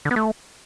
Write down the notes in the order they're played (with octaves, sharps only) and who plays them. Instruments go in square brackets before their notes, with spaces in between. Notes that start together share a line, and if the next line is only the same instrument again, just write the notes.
[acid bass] D3
B3
A3